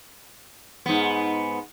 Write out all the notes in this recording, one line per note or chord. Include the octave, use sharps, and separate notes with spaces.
G#2 B3